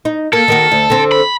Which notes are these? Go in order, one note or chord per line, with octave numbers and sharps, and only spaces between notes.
D#4
A#3 A4
D#3 A#3 F#4
D2
D3 C4
B5